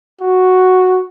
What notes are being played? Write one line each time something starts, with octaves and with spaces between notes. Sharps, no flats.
F#4